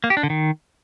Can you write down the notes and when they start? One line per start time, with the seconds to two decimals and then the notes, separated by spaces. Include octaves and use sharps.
0.04 A#3
0.10 G4
0.17 D4
0.23 D3
0.30 D#3